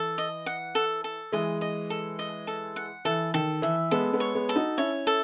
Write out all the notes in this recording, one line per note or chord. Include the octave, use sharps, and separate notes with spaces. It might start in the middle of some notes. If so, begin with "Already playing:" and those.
Already playing: E3 A4
D#5
F#5
A4
A4
E3 G#3 D#5
D#5
A4
D#5
A4
F#5
E3 A4
D#3 A4
E3 E5
G#3 B3 A4
G#3 B3
C#5
G#3 B3
A4
D#4 F#4
C#4 E4 C#5
A4